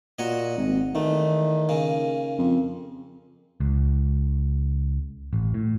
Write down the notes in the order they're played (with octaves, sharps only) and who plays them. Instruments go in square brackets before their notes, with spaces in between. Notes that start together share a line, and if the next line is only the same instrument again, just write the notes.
[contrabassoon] A#2 [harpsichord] F#4 C#5 D#5
[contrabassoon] G#1
[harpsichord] E2 A3 [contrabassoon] D#3
[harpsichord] C#3 A#3
[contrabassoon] F2
[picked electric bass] C#2
A1
A2